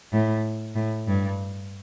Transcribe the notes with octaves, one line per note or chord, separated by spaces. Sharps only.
A2
A2
G2